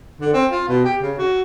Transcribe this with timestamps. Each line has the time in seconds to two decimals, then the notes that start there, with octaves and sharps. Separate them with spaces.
0.21 D3
0.33 C4
0.51 F4
0.68 B2
0.84 G4
1.02 C#3
1.18 F#4